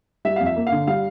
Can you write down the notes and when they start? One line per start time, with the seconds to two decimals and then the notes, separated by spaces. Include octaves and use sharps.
0.25 G3 E5
0.36 F5
0.40 F2
0.46 E5
0.56 A#3
0.67 F5
0.72 D3
0.87 G3 F5